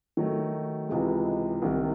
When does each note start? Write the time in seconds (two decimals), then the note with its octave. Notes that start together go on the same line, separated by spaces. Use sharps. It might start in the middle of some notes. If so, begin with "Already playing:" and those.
0.17 D#3 F#3 A3
0.89 C#2 C3 E3 G#3
1.62 C2 C3 D#3